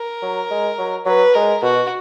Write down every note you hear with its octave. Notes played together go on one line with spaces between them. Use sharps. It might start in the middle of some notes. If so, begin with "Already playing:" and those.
Already playing: A#4
F#3
G#3
F#3
F#3 B4
G#3 A#4
B2 F#4